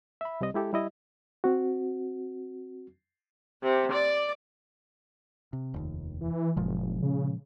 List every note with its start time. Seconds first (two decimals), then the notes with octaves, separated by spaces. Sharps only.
0.21 E5 B5
0.41 C2 G3 C4 D#5
0.54 G#3 E4 G4 A4
0.73 G3 E4 D#5
1.44 C4 F#4
3.62 C3
3.93 D5
5.53 C3
5.74 F1 D#2 D#3
6.21 E3
6.57 F#1 A#2 F3 G#3
7.03 C#3